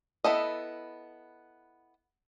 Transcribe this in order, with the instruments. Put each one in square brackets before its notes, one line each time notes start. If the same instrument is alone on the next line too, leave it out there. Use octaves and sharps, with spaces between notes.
[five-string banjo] B3 E4 A4 D#5